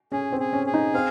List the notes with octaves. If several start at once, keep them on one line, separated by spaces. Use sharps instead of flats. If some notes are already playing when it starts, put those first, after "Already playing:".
C#4 G#4
C4
G#4
C#4
G#4
D#4
C4 F5